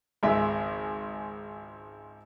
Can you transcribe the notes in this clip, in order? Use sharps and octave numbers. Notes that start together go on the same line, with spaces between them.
G#1 C#2 E5